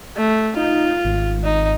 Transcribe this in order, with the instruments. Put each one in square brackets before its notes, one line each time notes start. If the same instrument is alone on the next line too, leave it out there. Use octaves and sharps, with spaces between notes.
[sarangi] A3
[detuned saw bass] D#4 [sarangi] F4
[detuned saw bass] G#1
[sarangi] D#4